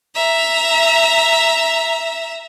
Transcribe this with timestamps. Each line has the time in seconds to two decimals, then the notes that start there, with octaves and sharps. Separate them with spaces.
0.15 E5 A#5